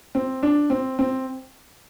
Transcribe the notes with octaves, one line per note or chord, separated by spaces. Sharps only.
C4
D4
C4
C4